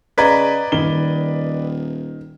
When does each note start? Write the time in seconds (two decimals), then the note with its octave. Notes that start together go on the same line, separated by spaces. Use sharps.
0.18 C#3 B4 D5 D#5 A#5 G#6 B6
0.72 D#1 D#3 G7